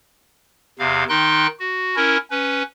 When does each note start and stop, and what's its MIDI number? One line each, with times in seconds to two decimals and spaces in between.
0.79 1.04 40
0.79 1.04 48
0.79 1.04 77
1.09 1.47 51
1.09 1.47 63
1.09 1.47 79
1.09 1.47 84
1.09 1.47 90
1.59 1.96 66
1.96 2.17 61
1.96 2.17 64
1.96 2.17 70
2.31 2.63 61
2.31 2.63 71